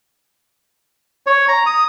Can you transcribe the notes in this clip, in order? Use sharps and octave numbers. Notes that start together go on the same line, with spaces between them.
C#5
A#5
D#6